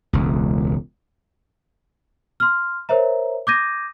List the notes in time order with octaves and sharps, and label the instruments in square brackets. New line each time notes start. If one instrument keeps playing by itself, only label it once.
[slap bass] E1 C#2
[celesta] C6 F6
A#4 C5 C#5 E5 A#5
D6 D#6 G6 G#6 A#6 D#7